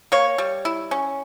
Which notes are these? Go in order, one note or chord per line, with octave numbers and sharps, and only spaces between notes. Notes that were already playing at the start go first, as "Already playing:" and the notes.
A#3 C#5
G3
E4
C#4